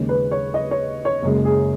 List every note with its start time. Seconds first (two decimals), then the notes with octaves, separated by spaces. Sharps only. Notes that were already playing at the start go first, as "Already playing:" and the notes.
Already playing: D#2 C#3 G#3
0.09 B4
0.31 C#5
0.54 D#5
0.71 C#5
1.05 C#5
1.22 F#1 F#2 C#3 G#3
1.45 G#4